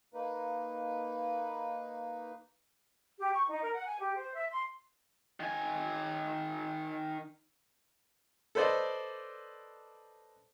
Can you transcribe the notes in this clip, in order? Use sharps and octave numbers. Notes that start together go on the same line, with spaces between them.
A#3 D#4 B4
G4
C#6
D#4
A#4
F#5
G#5
G4
C5
E5
C6
D#3 G#5
A4 B4 C5 D5 D#5